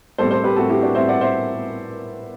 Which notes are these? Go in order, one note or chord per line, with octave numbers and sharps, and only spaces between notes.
A2 G3 C4 A4 C5
A4 C5
G4 B4
A2 G3 C4 F#4 A4
E4 G4
D4 F#4
A2 G3 C4 C5 E5
D5 F#5
C5 E5